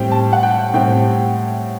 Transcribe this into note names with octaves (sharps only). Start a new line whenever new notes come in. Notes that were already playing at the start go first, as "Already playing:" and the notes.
Already playing: A2 G3 C4 G5
A5
F#5
G5
A2 G3 C4 G5